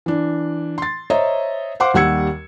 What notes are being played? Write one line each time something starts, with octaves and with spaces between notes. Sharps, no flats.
E3 D4
C6 A6
C5 C#5 D#5 E5 A#5
C5 F5 F#5 C6 D6
D#2 G3 F#5 E6 G#6 C#7